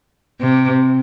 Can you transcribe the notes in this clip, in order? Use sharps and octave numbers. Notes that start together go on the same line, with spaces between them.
C3